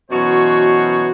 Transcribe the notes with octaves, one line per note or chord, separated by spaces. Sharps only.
F#2 B2 E3 F#4 C5 C#5